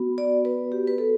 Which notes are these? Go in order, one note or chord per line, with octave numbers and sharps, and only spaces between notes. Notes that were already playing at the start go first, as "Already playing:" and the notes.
Already playing: B3 F#4
D5
B4
G4
B4
A4